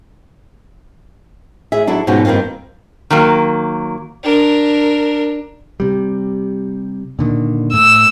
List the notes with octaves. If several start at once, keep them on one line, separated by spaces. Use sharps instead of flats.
A2 G#4 E5
F#3 D4 E4 A4
G#2 B2 F3 G3 C#4 F#4
G2 D#3 A#3 C4 F4
D#3 F#3 A#3
D4 A#4
C3 G3
A#2 D3 D#3
A2 E6